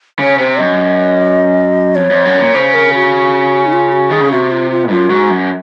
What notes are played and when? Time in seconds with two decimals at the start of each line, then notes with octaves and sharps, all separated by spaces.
0.19 C#3 C#5
0.38 C3 C5
0.59 F#2 D#5
1.95 F2 C#5
2.10 F2
2.25 F#2
2.40 A#2
2.55 C#3 C5
2.74 A#4
2.94 F#4
3.66 D#4
3.73 F4
3.92 F#4
4.10 D#3 G#4
4.21 C#3
4.32 C3 F#4
4.52 F4
4.71 F4
4.90 F#2 F4
5.10 G#2 F#4
5.30 F#2